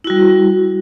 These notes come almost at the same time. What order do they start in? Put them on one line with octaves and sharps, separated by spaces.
E4 F#4 G3